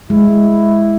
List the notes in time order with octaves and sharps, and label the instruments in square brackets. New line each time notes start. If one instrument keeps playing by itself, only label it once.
[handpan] G#3 [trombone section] E4